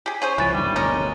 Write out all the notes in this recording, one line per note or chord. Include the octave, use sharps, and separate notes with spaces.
G4 G#4
C#4 G#4 C5 C#5 D#7
C#2 E3 F3 F#6 A6 D#7
F#1 G2 D#3 G3
F#1 D2 B2 D#3 G#3 C#4 A#4